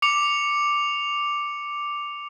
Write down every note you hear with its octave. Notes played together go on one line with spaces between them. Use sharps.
D6 C#7 F7